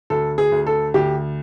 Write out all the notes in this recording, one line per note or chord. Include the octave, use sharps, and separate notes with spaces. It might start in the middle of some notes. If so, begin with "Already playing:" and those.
D2 A4
G#4
D2
A4
D2 G4